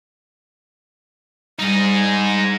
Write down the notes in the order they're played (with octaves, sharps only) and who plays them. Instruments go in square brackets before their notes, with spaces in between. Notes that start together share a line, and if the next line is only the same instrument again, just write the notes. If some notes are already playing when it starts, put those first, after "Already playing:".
[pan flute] G3 [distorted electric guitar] D#4 G#4